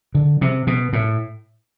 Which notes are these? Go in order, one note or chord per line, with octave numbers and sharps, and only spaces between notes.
D3
C3
B2
A2